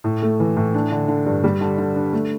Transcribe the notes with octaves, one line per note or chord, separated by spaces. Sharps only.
A2
A3
E3
A2
D4
D3
D3
G2
G3
D3
D3
D4
A3